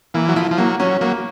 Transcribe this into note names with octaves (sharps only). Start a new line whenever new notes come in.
E3 A#3
F#3
F3 E4
F3
F#3 A#3
F#3 C#4
F#3 A#3